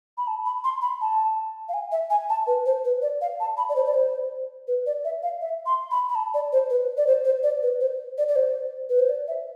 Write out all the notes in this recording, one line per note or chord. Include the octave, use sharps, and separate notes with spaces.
B5
A5
B5
C6
B5
A5
F5
G#5
E5
G#5
A5
B4
C5
B4
D5
F5
A5
B5
D5
C5
D5
C5
B4
D5
E5
F5
E5
C6
B5
B5
A5
D5
C5
B4
D5
C5
C5
D5
B4
C5
D5
D5
C5
B4
C5
D5
E5